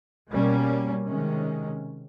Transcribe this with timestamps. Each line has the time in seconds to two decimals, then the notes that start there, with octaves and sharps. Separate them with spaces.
0.30 B2 G3 A#3 C#4
1.05 C3 D#3 G#3 C#4